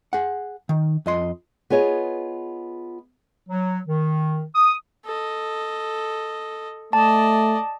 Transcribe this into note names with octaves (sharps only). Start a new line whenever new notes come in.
G#4 F#5
D#3
F2 D#5 C6
B3 F4 G#4 C#5 D#5
F#3
D#3
D#6
A4 D#5
A3 D5 D#5 A5